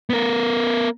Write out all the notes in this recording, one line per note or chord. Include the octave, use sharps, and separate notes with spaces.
B3 A#4